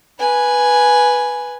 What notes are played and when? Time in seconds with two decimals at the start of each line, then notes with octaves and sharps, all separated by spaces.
0.19 B4 G#5